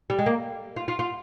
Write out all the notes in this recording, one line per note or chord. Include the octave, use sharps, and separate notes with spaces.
G3
G#3
A#3
F4
F4
F4